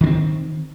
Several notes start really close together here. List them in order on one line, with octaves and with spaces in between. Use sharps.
D#3 D4 C4